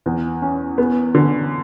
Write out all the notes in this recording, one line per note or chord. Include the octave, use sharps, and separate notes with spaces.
E2
C#4
B3
D3